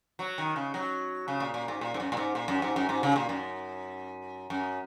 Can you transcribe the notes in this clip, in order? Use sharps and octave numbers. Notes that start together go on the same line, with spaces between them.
F#3
D#3
C#3
F#3
C#3
A#2
A#2
G#2
A#2
G#2
F#2
A#2
G#2
A#2
F#2
G#2
F#2
G#2
C#3
A#2
F#2
F#2